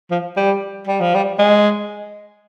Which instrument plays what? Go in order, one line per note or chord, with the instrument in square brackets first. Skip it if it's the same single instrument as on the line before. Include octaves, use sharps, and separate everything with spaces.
[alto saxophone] F3
G3
G3
F3
G3
G#3